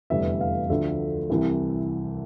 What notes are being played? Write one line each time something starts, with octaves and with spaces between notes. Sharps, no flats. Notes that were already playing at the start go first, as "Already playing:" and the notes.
F1 E2 D3 G3 E5
F5
D2 D3 F3 A3 E5
C2 C3 E3